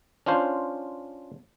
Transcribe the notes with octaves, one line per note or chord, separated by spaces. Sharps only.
C#4 D4 F4 C5